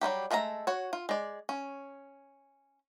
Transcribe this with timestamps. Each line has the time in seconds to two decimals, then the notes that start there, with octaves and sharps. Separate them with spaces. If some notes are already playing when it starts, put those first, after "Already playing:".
0.01 F#3 G3 A#3 G4
0.31 G#3 A3 A4 A#4 A#5
0.67 F#4 C#5
0.93 F4
1.09 G#3 D5
1.49 C#4